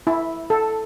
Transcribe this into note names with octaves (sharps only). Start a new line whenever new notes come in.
E4
A4